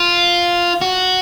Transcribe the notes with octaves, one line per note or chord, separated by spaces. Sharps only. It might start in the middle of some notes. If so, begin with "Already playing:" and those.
Already playing: F4
F#4